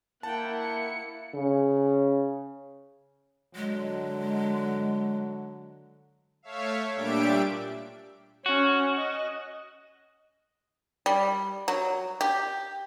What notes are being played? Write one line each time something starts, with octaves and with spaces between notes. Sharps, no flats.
A#3 E4 F#5 G5 A5
C#7
C#3
D3 F#3 G#3
A3 C#5 E5 F5
A#2 G3 D4 G4 E5 D7
C#4 F#4
D#5
G3
F#3
G4